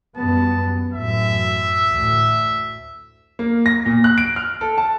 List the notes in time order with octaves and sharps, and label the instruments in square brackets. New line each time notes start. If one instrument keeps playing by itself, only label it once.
[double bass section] F#2 G3 B3 [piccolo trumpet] A5
[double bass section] A1 F#2 [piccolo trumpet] E5
[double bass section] D2 A2
[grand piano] A#3
A#6
A#2
F#6
D7
F6
A4
A5